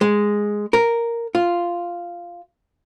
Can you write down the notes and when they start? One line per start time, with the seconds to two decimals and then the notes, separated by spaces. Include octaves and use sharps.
0.01 G#3
0.73 A#4
1.35 F4